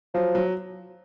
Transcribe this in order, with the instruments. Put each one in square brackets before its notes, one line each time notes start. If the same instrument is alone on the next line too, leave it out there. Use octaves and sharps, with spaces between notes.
[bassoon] F3 [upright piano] F#3
[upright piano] F#3